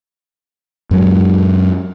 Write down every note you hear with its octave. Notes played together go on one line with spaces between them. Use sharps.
F#2 F#3 G#3